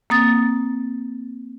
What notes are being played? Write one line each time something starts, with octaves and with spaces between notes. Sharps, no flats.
A#3 C4 D#6 A6